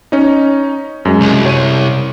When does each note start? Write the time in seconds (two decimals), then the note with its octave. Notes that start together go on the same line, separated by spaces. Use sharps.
0.12 C#4 D#4
1.05 F#2 G#3
1.21 C2
1.46 C#5 D#7